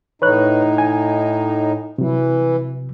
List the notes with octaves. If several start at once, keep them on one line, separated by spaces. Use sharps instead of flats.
A2 D#4 B4 C#5 F#6
G#5
C3 E3 F#3